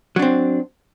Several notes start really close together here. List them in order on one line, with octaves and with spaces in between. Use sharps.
F#3 D4 C4